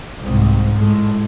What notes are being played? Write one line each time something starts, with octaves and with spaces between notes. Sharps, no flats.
C2 G#2
A2 G#3